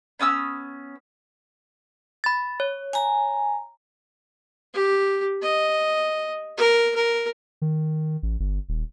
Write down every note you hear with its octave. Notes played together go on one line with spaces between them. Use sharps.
B3 C#4 D#6 E6
B5 A6
C#5
G#5 A#5
G4
D#5
A#4
A#4
D#3
A1
G1
D#1